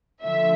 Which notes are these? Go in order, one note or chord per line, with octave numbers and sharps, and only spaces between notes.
D3 F3 A3 E5